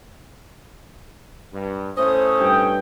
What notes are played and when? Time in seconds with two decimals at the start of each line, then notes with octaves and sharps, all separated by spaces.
1.52 G2
1.97 A2 A3 C#4 C5 D#6
2.40 G2 G3 G5